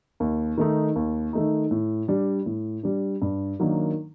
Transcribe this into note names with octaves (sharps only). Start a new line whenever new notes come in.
D#2
D#3 A3 D#4
D#2
D#3 A3 D#4
A2
G3 D4
A2
G3 D4
G2
D#3 F#3 A#3 D4